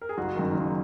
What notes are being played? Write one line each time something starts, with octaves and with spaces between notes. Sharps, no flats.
A#4
G#4
F#1 F#4
F#2 D#3
F#1